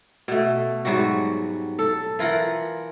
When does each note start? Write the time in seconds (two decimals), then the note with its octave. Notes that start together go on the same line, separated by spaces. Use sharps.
0.28 B2 A3
0.85 G#2 F#3 G3 F#4
1.79 A4
2.19 E3 F4 A#4 F#5